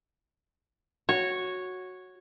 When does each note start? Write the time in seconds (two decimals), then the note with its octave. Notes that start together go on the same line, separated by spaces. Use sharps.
1.09 F#4 C#5